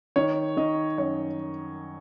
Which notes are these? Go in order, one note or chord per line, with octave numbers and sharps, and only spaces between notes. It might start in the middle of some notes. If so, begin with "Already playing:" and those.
D#3 C#5
D#3 D#5
F#2 C#5